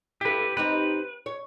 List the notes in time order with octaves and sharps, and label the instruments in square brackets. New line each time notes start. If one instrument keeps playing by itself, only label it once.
[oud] E4 A4 [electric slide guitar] G4 B4
[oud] C4 D#4 G4 [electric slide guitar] B4
[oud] C#5